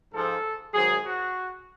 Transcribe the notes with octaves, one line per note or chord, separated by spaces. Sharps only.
G#2 F3 A4
G#2 D#3 F#3 G#4
F#4